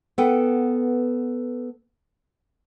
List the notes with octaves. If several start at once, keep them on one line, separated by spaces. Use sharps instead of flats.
B3 A4 B4 F#5 G5